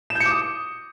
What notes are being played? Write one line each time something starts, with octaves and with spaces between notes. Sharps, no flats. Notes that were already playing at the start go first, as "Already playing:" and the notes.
E7
G6
C#7
D6
D#6